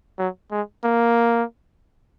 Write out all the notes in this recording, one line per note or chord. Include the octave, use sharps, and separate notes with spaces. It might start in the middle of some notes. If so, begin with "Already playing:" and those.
F#3
G#3
A#3